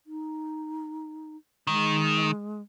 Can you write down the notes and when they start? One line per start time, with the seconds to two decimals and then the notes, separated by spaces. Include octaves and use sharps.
0.07 D#4
1.67 D#3 G#3